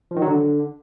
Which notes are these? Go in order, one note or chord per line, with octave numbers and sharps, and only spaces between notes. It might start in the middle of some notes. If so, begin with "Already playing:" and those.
F3
D#3
F#3
D3